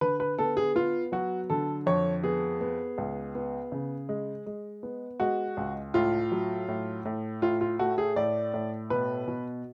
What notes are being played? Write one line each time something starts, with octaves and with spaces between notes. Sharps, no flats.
D3 B4
B4
B3 A4
G#4
B3 F4
F#3 F#4
D3 A4
F2 C#5
B3 G#4
B3
C#2
B3
C#3
G#3
G#3
B3
G#3 F#4
C#2
A2 F4
F#3
A2
A2
A2 F4
F4
A3 F#4
G#4
A2 D5
A2
B2 B4
B2